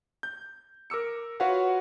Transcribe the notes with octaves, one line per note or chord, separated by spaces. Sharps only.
G6
A#4 D6 E6 C#7
F4 F#4 B4 C#5 F5 F#5